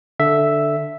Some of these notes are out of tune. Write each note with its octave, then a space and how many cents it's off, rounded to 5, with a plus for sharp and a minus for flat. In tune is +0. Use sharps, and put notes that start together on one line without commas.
D3 +0 E5 +0